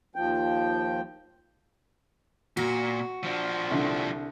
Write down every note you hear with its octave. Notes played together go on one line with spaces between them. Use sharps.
D#2 F3 G5
A#2 F#4
F3 D4
C2 D3